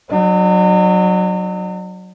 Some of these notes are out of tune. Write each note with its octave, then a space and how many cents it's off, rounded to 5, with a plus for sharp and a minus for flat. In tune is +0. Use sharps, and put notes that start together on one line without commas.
F#3 +0 D#4 -45